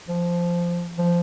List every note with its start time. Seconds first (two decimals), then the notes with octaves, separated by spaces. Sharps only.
0.09 F3
0.98 F3